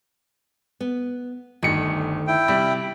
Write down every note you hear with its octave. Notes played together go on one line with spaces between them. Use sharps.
B3
G1 D2 D#3 C#7
E4 G5
C3 G3